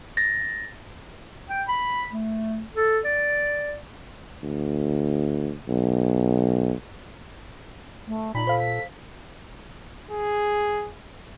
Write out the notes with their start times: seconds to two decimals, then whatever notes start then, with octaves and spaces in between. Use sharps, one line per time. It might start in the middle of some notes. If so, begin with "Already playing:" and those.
0.17 A6 A#6
1.50 G5
1.68 B5
2.12 A3
2.75 A4
3.05 D5
4.42 D2
5.69 B1
8.07 A3
8.35 A#2 D#4 B5
8.47 A4 C5 F5
8.60 B6
10.11 G#4